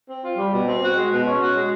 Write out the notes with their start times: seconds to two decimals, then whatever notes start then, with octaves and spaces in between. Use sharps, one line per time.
0.09 C4
0.23 F4
0.38 G3
0.53 B2
0.67 C4
0.81 F#4
0.96 G#3
1.11 B2
1.26 C#4
1.41 F#4
1.55 G#3